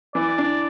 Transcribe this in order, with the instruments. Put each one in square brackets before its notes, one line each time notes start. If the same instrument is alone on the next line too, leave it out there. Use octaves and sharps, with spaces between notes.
[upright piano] E3 [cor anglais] D5
[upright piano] D4